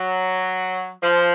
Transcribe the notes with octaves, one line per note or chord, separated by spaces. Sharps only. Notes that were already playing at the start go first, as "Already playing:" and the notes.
Already playing: F#3
F3